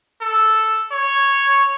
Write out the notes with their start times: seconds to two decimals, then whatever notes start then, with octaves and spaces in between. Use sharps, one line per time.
0.21 A4
0.92 C#5